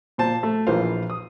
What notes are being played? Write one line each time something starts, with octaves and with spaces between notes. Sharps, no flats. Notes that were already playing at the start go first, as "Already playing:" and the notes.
A#2 C5 A5
A3
A#1 E3 F4 A#4 C5 F5
D#6